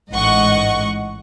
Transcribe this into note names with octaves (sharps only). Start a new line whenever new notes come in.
A1 G#2 D#5 F#5 C#6